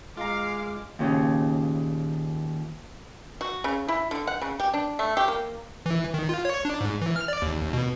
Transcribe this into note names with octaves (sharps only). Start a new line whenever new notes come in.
G#3 F4 F5 A#5 D6 F6
D#2 A#2 C#3
F#4
C#3
E4
D3
F#5
C#3
G4
D4
A3
G4
A#3
E3
D#3
F4
C#5
D4
G#2
E3
F6
D5
D#2
B2